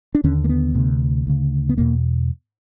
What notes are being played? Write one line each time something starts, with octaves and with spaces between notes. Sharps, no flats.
D4
D#2 D3 C#4
A#3
B3
D2 C3
D2 C#3
B3
E2 B2 A#3